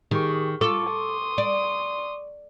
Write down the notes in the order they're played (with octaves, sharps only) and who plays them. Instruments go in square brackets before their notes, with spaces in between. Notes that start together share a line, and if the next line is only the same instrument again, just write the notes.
[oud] D#3 [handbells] G4 G#4 C#6
[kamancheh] F4 [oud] A4 [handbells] C#6 D6
[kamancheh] C6 D#6
[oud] D5